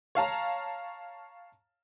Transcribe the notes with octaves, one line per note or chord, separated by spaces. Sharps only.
C#5 F5 A5 A#5